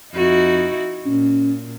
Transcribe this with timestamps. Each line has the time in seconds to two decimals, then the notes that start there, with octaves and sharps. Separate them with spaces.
0.14 F2 D#4 E4 F#4
1.06 A#2 C#4